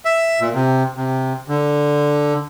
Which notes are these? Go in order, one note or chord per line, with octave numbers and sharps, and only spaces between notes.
E5
A#2
C3
C3
D3